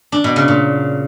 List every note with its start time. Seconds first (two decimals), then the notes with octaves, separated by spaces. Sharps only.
0.12 D4
0.24 B2
0.36 C#3
0.48 A#2